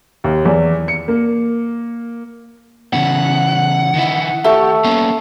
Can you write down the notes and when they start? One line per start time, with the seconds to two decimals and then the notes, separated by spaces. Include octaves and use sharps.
0.24 D#2
0.45 E2
0.88 C#7
1.08 A#3
2.93 C#3 E3 B3 F#5
3.94 D#3 D#4 E4
4.44 A3 G4 C#6
4.84 A#3 B3 C#4